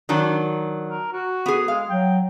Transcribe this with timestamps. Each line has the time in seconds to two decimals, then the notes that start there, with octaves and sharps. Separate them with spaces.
0.09 D#3 F#3 D4
0.90 A#4
1.12 F#4
1.46 B3 G#4
1.68 G#3 F5
1.89 F#3 G5